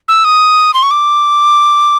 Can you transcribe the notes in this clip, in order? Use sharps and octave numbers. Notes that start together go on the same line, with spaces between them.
E6
D#6
C6
C#6
D6